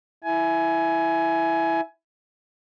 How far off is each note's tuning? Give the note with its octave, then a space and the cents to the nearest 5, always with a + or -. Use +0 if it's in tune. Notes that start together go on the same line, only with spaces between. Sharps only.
E4 +0 G#5 +20